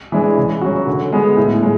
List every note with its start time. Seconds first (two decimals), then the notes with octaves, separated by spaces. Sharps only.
0.12 E3 G#3 D4
0.37 C#3
0.61 F#3 C#4 F#4
0.87 D3
1.12 G#3 B3
1.37 A2
1.63 G#3